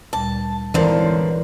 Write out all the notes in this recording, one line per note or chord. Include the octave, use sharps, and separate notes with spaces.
D2 A#2 G3 A5
G#1 E2 D3 E3 A#4 C5 D5
C#5